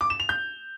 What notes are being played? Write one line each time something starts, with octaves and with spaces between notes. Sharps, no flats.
D6
E7
F7
G6